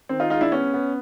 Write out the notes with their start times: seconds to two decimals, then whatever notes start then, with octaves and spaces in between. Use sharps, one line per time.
0.09 D#3 C4
0.20 D#4 F4
0.30 G#3 D#4 F4
0.41 D4 E4
0.52 B3 C#4
0.74 B3